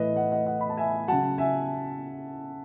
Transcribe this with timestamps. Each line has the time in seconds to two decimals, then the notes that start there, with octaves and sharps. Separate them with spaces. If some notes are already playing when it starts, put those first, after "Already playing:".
Already playing: A2 E3 B4 D#5
0.15 D#5 F#5
0.32 D#5 F#5
0.46 D#5 F#5
0.61 B5
0.69 A5
0.77 E5 G#5
1.08 C#3 F#3 F#5 A5
1.38 E5 G#5